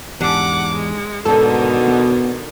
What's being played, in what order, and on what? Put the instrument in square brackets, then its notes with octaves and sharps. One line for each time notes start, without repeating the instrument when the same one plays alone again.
[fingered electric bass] E2 [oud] G#2 D4 G4 [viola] F#5 D6
[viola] G#3
[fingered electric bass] G#2 [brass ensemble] B2 [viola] D3 D#3 [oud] A4
[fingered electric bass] B3